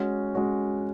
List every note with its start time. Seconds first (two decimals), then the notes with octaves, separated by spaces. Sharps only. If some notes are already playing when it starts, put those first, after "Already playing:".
Already playing: G#3 C#4 F#4
0.34 G#3 C#4 F#4